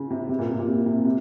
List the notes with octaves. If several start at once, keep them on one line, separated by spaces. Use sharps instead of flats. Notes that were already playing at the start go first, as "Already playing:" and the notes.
Already playing: C#3
C3
C3
A#2
C3
A#2
C3
C3
C3